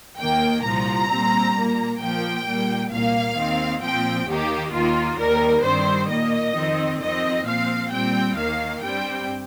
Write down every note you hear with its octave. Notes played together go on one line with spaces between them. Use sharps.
D#2 D#3 A#3 G5
C2 A#2 F3 A#5
A#2 G3 C4
A#2 A#3
A#2 F3 A#3 G5
A#2 G3 A#3
C2 A#2 A#3 F5
D#2 D#3 C4
A#2 F3 C4 G5
D#2 D#3 A#3 G4
D#2 D#3 A#3 F4
D#2 D#3 G3 A#4
G2 D#3 G3 C4 C5
A#2 A#3 D#5
F2 D#3 C4
F2 D#3 C4 D#5
A#2 F3 C4 F5
A#2 G3 C4 G5
D#2 D#3 A#3 F5
G2 G3 C4 G5